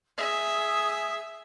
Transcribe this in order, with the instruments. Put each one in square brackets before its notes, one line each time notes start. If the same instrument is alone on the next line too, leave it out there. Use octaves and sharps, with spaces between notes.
[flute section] G#4 D#6 [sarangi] E5